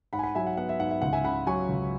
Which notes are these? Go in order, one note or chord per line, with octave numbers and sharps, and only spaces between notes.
G#2 F#5 B5
G#5
F#5 B5
F#3 E5 G#5
F#5
B3 F#5
E5
G#2 F#5
E5
C#2 F#5
E5 G#5
C#3 F#5 B5
F#3 G#5 C#6
C#2